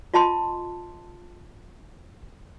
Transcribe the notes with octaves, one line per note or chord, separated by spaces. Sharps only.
F4 D#5 A5 C6